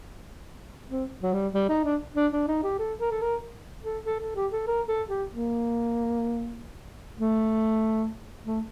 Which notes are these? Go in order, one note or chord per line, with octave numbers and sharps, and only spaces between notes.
C4
F#3
G3
G3
D#4
D4
D4
D4
D#4
G4
A4
A#4
A4
A#4
A4
A4
A4
G4
A4
A#4
A4
G4
A#3
A3
A3